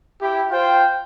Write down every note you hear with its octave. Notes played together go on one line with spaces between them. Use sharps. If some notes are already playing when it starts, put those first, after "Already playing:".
E4 G4
F4 C5 G5